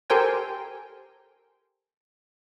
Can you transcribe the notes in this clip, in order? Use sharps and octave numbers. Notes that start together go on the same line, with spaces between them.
G4 A4 A#4 C5 G5 G#5